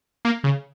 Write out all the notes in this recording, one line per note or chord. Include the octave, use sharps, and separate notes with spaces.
A#3
C#3